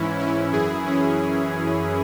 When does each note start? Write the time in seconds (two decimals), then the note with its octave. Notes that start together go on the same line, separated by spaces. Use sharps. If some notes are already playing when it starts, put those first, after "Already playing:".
Already playing: G#2 E3 C#4 E4
0.18 C#4 E4
0.53 F#2 E3 E4 G#4
0.86 C#4 E4